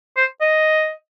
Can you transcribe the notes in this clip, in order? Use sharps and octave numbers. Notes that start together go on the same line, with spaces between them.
C5
D#5